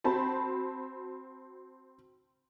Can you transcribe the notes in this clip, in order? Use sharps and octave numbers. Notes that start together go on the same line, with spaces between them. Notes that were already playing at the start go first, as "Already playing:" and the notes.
C4 F#4 A5 B5